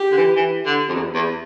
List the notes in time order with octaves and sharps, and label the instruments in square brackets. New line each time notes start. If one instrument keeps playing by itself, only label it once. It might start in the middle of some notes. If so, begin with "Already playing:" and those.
Already playing: [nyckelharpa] G4
[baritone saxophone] D3
E3
E3
D3
F2
E2
E2